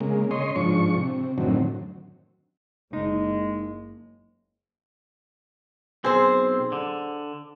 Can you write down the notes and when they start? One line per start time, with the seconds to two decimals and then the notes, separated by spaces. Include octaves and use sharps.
0.01 C#3 G#3 A#3
0.31 C#3 C#5 D#5 C6
0.56 G#2 F3 D4 C#6
0.95 C3
1.38 F#2 A2 D3 D#3 F#3 C4
2.93 F#1 G#3 D#4
6.04 B1 C4 G#4 C5
6.72 D3